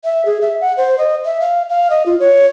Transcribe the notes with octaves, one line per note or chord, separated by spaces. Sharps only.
E5
G#4
E5
F#5
C5
D#5
E5
F5
F5
D#5
F4
C#5